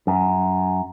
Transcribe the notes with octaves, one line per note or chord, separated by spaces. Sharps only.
F#2